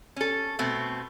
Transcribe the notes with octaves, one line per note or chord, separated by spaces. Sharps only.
C#4 A4
B2 A3 C4